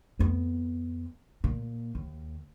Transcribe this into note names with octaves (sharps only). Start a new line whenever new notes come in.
F2 B3
A#2
D#2